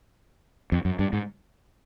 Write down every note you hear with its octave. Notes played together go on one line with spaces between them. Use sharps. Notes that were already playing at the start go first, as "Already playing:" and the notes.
F2
F#2
G2
G#2